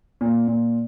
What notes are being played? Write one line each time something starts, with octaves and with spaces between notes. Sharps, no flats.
A#2
A#2